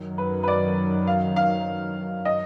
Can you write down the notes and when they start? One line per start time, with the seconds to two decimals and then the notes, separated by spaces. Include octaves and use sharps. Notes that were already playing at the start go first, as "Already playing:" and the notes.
Already playing: F#2 D#3 F#3
0.18 B4
0.43 B4
0.48 D5
1.07 F5
1.36 F5
2.25 D#5